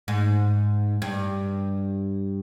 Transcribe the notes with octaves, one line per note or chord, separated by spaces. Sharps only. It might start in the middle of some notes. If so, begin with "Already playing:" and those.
G#2
G2